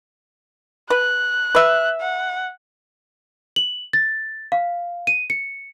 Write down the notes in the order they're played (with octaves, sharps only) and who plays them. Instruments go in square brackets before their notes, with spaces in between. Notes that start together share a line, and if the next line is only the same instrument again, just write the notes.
[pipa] B4 [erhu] F#6
[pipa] B4 E5
[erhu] F#5
[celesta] F#7
A6
F5
D#7
C#7